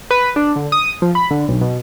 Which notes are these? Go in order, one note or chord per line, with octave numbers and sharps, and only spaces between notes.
B4
D4
D3
D#6
F3
B5
D3
B1
B2